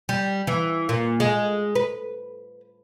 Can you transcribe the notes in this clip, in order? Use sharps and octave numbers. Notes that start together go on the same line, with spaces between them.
G3
E3
A#2
G#3
B4